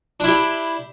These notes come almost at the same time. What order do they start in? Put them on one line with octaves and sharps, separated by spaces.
D4 E4 G4